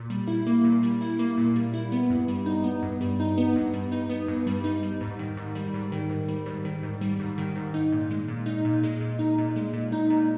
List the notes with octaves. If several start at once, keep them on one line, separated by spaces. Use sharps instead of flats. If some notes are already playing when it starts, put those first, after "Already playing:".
Already playing: A#2
G3
E4
A#3
A#2
G3
E4
A#3
A#2
G3
E4
B3
G2
G3
D#4
B3
G2
G3
D#4
B3
G2
G3
D#4
B3
G2
G3
D#4
G3
G#2
D#3
G#2
G3
G#2
D#3
G#2
G3
G#2
D#3
G#2
G3
G#2
D#3
G#2
D#4
A#2
G#3
A#2
D#4
A#2
G#3
A#2
D#4
A#2
G#3
A#2
D#4
A#2